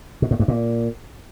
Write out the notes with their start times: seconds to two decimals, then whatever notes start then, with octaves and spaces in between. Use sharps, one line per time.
0.22 B2
0.31 A2
0.40 G2
0.48 A#2